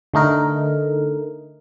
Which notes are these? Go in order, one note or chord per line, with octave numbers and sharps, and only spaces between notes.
D3 A3 D#4 A#4